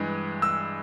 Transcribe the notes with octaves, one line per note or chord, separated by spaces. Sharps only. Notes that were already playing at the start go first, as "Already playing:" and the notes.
Already playing: G2 E3 G#3
E6